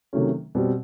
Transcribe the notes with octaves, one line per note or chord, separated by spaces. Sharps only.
C3 D#3 F#3 A3 C#4
B2 G3 C4